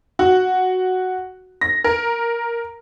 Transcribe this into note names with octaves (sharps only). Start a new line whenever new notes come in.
F#4
A#6
A#4